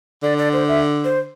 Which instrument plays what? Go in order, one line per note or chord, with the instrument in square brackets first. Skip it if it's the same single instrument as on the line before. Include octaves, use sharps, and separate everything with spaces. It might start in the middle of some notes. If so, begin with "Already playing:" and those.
[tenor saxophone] D3 [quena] D5
[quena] D5
C5
E5
C5